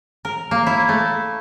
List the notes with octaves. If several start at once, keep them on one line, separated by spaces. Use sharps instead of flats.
A#4
A#3
E4
A3